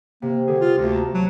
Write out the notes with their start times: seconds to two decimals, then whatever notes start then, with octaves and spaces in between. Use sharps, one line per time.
0.22 C3 A#3
0.47 D3 G3 G#4
0.61 F4
0.78 D2 A3 A#3
0.92 A5 A#5
1.14 F#3